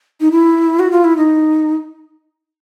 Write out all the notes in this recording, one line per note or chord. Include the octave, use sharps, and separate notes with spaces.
D#4
E4
F#4
F4
E4
D#4